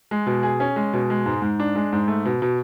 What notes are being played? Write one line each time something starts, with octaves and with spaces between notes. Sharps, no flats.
G#3
B2
G#4
C#4
G#3
B2
G#3
G#2
G#2
D4
G#3
G#2
A3
B2
B2